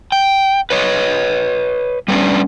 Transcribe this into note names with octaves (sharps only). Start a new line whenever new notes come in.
G5
B4 C#5 D#5
G3 A3 B3 C#4 D4